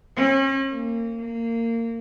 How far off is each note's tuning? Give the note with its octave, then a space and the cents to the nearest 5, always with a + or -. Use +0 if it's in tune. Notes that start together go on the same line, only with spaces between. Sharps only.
C#4 -40
A#3 -25
A#3 -25